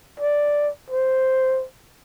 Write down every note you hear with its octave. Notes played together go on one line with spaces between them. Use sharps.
D5
C5